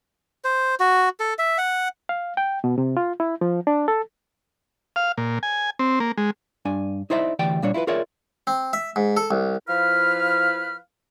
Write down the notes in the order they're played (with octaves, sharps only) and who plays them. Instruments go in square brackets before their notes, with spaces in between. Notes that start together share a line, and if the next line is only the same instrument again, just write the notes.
[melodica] C5
F#4
A4
E5
F#5
[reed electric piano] F5
G5
B2
C3
F4
E4
F3
D4
A4
[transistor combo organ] F5
A#2
G#5
C4
A#3
G#3
[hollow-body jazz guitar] G2 D4 G#5
D#4 E4 C5 D5 E5
D2 E3 G4 D5 G5
A#2 G3 D4 C#5
E4 F4 A4 B4
F4 G#4 A#4 C#5 D5 E5
[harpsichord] C4
E5
G#2
A4
C2
[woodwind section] F3 E4 B4 F5 F6